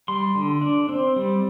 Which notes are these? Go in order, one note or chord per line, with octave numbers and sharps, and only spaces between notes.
G3 C6
D3
D4
C4
G3